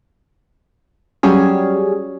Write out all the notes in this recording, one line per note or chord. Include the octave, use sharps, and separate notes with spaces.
F#3 G3 C#4 G#4